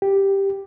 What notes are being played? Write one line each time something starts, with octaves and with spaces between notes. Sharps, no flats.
G4